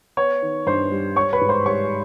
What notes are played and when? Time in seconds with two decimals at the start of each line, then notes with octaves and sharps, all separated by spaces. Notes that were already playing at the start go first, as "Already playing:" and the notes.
0.17 B3 C#5 C#6
0.42 D#3
0.66 G2 C5 C6
0.92 G3
1.16 G3 C#5 C#6
1.33 B4 B5
1.41 G#2
1.49 C5 C6
1.66 G3 C#5 C#6